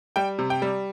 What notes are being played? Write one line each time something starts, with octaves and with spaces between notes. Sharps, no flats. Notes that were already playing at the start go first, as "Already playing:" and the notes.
G3 G5
C3
G5
G3